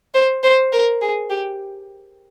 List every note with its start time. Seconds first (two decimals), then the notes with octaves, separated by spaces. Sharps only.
0.14 C5
0.43 C5
0.73 A#4
1.01 G#4
1.30 G4